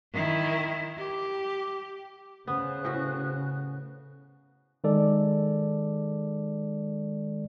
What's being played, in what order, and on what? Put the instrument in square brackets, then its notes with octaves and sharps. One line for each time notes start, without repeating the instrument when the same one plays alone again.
[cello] D#3 E4
G4
[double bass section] C#3 [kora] B3 [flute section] C5 F#6
[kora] A2 F#4
[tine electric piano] D#3 G#3 A4 D5